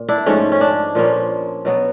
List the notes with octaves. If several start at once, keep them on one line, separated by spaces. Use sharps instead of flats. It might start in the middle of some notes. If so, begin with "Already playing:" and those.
Already playing: A#2
D4 E4
G#2 F3 A3 C#4
C#4
D4
A#2 F3 A#3 C#4
B2 F#3 B3